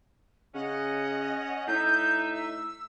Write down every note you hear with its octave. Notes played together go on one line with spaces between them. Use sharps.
C#3 C#4 D#5 F#5
A2 D#4 E5 G6
E6